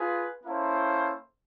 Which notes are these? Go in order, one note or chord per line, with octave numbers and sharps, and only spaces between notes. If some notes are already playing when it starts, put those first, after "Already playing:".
Already playing: F4 G#4 B4
A#3 C#4 E4 A4 C5